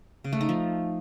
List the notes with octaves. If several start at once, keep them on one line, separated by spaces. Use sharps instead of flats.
C#3
A3
D#4
F3